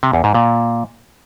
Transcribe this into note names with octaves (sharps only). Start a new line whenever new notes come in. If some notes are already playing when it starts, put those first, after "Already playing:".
C3
E2
G#2
A#2